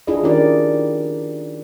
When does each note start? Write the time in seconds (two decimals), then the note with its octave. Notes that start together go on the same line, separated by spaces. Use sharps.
0.07 D4 E4 F4 G#4 D#5
0.23 D#3 C#4 D#4 G4 A#4 D5